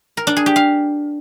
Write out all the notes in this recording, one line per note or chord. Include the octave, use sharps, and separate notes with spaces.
A#4
D4
G#4
G4
F5